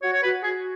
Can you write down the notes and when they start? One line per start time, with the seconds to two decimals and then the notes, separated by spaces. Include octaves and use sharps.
0.02 F#4 C#5
0.13 C#5
0.23 F#4 B4
0.43 F#4 G#4